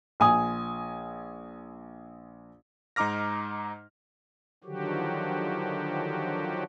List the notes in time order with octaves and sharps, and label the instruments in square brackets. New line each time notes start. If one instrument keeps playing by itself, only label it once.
[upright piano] A#1 G#5 D#6
[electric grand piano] G#2 D#4 A#5 D6 F6 A#6
[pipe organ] D3 D#3 F3 F#3 F#4 G4